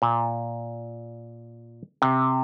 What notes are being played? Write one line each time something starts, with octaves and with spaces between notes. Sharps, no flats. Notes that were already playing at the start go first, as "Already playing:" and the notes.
A#2
C3